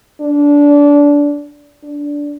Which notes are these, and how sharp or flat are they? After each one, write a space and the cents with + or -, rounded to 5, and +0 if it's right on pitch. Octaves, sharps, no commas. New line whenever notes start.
D4 -20
D4 -15